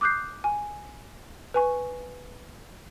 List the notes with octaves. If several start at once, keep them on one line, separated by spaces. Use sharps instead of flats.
D6 D#6 F#6 G6 C7
G#5
B4 G#5 C#6